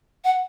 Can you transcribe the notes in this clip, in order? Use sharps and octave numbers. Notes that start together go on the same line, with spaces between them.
F#5